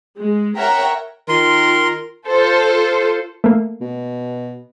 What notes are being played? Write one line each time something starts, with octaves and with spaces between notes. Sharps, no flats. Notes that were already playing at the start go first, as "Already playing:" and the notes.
G#3
A#4 C#5 E5 F#5 G5 A#5
D#3 F4 A#4 C6
F4 A4 C5
A3 A#3
B2